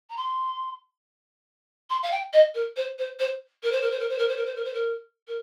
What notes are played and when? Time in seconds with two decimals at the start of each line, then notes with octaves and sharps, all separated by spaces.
0.09 A#5
0.16 C6
1.89 C6
2.02 F5
2.11 G5
2.32 D#5
2.54 A#4
2.76 C5
2.98 C5
3.19 C5
3.62 A#4
3.71 C5
3.81 A#4
3.90 C5
3.99 A#4
4.09 C5
4.18 A#4
4.27 C5
4.36 A#4
4.45 C5
4.55 A#4
4.64 C5
4.73 A#4
5.27 A#4